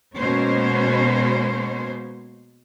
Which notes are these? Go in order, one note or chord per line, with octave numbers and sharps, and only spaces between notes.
B2 G#3 A#3 C#4 C5 C#5